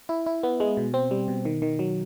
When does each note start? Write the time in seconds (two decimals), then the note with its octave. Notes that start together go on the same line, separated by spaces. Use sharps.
0.09 E4
0.26 E4
0.43 B3
0.60 G#3
0.77 B2
0.94 C4
1.11 G3
1.28 B2
1.45 D#3
1.62 D#3
1.79 F#3